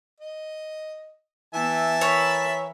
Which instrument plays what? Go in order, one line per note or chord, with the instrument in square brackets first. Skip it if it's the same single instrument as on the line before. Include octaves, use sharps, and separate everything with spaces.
[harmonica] D#5
[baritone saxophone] E3 [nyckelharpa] B3 [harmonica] E5 A5
[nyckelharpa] A#4 B5 [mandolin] C#5